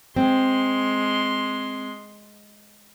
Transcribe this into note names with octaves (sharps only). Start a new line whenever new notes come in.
G#3 C4 C6